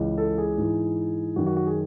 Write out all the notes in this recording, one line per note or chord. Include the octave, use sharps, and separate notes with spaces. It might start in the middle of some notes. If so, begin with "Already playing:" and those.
Already playing: C#2 C#3 E3
A4
G#4
G#2 E3
F#2 D#3 F#4
F#4
F#4
G#4